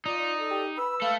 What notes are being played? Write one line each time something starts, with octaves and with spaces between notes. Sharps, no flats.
D#4 F4 D5
D5
A4
G4
B4 B5 E6
A3 A4 F5